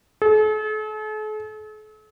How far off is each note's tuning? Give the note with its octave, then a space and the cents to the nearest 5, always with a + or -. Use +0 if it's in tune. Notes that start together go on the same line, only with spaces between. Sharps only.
A4 -45